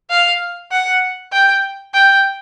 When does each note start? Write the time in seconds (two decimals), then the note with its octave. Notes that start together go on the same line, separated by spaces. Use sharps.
0.10 F5
0.71 F#5
1.33 G5
1.94 G5